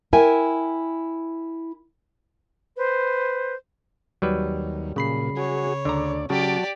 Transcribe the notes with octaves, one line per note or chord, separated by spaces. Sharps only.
E4 A#4 E5 G5 G#5
B4 C5
D#2 F#3 G3 B4
A#2 C#3 B5 C7
F#4 G#4 C#5
D2 D3 D5 A#5
C#3 F#3 F#4 G4 D5 A5